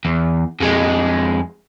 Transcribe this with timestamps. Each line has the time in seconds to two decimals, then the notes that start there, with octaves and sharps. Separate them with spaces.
0.05 E2
0.61 F2 G#3